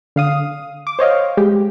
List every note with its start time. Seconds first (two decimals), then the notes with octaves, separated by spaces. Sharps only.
0.16 D3 F5 D#6
0.87 D6
0.99 C5 C#5 D#5 F5
1.37 G#3 G4